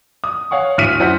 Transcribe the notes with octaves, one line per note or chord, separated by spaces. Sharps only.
D#6
C#5 F5 F#5 C#6
D2 A2 F6 B6 D#7
F#2 E4 C5 F#5 B6